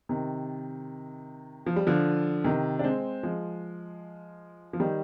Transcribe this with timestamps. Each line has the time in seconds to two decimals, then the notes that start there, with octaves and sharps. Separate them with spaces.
0.09 C3 D#3
1.66 F3
1.76 G3
1.87 D3 F3
2.44 C3 D#3
2.79 D4
2.84 G#3 C4
3.23 F3 G#3
4.73 F3
4.80 D#3 G3